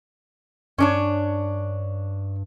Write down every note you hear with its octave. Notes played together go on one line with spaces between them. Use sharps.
G2 C#4 D4 C#5